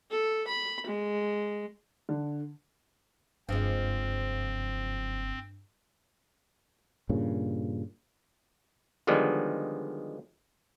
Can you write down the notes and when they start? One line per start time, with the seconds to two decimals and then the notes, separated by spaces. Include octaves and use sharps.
0.11 A4
0.47 B5
0.86 G#3
2.09 D3
3.49 F#1 G2 F3 G#3 C4
7.09 G2 A#2 C#3
9.07 D3 D#3 F3 G3 G#3 B3